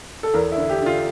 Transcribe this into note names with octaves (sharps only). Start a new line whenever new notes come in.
A4
E2 A#4
E4
D3
G4
D3 F4